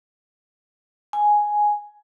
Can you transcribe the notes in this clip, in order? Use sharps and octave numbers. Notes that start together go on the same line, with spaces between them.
G#5